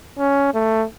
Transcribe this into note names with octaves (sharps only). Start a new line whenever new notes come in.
C#4
A3